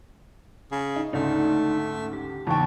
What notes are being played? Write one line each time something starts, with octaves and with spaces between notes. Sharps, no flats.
C#3
D#4
D2 G#2 C#3 A3 D#4 D5
G4
E2 G#2 C#3 B3 G5 A5 C#6